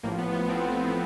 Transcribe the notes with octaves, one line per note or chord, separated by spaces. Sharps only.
A1 A2 F3 A#3
B3
B3
A1 A2 F3 C4